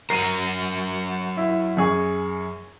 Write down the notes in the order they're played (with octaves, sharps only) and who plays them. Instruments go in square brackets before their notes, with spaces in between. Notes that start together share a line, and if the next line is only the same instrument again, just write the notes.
[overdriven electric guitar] F#3 A#4 [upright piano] C7 D#7
[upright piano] E4
F#2 G#4 C#6